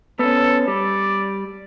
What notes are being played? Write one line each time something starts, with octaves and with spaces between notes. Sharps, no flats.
B3 C#4 A4
G3 D5